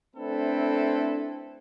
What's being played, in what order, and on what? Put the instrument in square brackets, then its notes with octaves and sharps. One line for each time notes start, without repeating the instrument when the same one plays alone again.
[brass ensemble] A3 C4 D4 E4 A4 B4